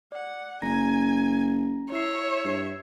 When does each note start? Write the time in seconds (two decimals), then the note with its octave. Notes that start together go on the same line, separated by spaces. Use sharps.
0.12 D5 F#5
0.62 F#1 C#4 G#5 A#5 A#6
1.92 E4 C#5 E5 C7
2.45 G2 G#6 C7